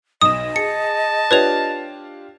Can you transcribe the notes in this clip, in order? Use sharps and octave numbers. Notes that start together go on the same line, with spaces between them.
B1 D#5 D#6 E7
G#4 A5 C#7
D4 F4 G4 B4 C#5 F7